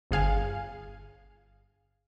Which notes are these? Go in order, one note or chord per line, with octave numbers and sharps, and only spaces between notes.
G1 G#4 F5 G#5